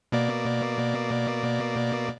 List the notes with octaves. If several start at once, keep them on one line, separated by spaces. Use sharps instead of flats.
B2 A#3 D5